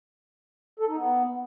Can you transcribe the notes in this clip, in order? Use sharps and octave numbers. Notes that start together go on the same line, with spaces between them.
A4
D#4
B3